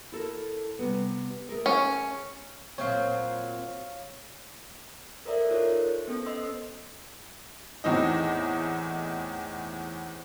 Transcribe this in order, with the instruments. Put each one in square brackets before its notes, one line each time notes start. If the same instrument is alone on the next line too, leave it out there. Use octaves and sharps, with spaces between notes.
[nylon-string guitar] E4 A4 A#4
C3 G3 B3
A3 G#4 A#4
[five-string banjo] C#4
[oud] A#2 F#3 C4 [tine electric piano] C#5 F5
[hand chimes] A4 A#4 C5 D5 E5
D#4 F4 A4 A#4 C#5
C5
B3 C#4 A4 C5
D#5 C6 E6
[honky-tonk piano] E2 A2 C4 D#4 D#5